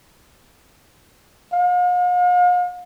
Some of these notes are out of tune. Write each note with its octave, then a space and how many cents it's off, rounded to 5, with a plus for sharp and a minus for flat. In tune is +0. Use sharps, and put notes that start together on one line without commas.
F5 +45